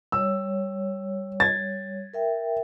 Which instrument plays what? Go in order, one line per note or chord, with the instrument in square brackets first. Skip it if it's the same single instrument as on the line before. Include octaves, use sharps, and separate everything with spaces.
[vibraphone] G3 C#5 [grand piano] E6
[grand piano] G#6 A6
[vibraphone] A#4 E5 G5